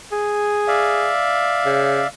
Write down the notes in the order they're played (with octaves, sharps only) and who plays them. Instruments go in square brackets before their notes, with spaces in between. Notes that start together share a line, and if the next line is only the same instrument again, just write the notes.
[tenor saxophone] G#4
[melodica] D5 E5 F5
[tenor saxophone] C#3